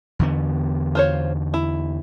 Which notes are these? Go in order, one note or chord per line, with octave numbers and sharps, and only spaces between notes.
E2 D3 B3
F4 C5 C#5
E4